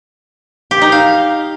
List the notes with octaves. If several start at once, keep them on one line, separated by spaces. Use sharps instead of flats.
G4
D#4
F5